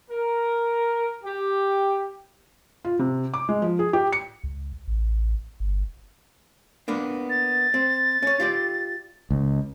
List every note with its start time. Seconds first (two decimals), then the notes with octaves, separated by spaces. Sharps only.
0.11 A#4
1.24 G4
2.85 F4
2.99 C3
3.34 D6
3.49 G#3
3.62 F3
3.79 G#4
3.93 G4
4.13 C#7
4.44 C#2
4.87 A1
5.60 G1
6.88 A#3 B3 D4
7.30 A6
7.74 C4
8.23 C#4 C#5
8.40 F4 G4 D5
9.31 C#2